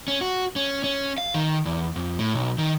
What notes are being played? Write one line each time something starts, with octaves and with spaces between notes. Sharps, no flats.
C#4
F#4
C#4
C#4
F5
D#3
E2
F2
A2
B1
D#3